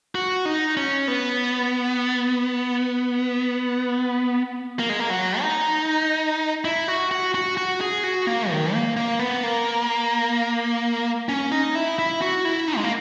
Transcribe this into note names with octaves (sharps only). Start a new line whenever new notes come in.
F#4
D#4
C#4
B3
A#3
G#3
A#3
F#3
D#4
E4
F#4
F#4
F#4
F#4
G#4
F#4
A#3
D#3
A#3
A#3
B3
A#3
C#4
D#4
E4
E4
F#4
E4
D#4
G#3
A#3